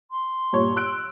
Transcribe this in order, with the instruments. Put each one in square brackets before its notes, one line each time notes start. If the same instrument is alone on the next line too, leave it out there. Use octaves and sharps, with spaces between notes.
[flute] C6
[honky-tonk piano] G2 A#2 C#5
E6 F#6 D7